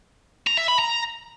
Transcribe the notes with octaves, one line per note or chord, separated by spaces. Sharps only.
A#5
E5
B5
A#5